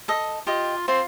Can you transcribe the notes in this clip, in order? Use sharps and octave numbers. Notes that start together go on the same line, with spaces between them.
A4 D#5
F4 G4 D#5
C4 F4